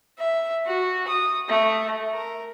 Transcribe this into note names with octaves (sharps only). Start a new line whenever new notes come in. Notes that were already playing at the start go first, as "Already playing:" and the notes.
E5
F#4
D#6
A3
A#4